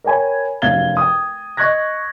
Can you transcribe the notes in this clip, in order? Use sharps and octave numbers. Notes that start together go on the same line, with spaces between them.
A#4 C#5 G5 G#5 B5
F1 F#2 F5 G#6 A6 G7
G5 D#6
D#5 C#6 F#6 G#6 A#6